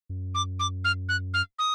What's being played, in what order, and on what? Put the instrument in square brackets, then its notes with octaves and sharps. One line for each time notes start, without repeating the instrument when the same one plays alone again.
[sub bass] F#2
[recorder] D6
D6
F6
F#6
F6
D#6